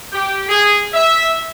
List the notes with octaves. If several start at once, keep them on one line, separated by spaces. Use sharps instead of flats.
G4
G#4
E5